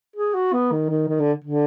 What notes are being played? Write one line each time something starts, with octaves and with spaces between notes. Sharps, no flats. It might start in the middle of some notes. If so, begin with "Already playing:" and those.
G#4
F#4
B3
D#3
D#3
D#3
D3
D3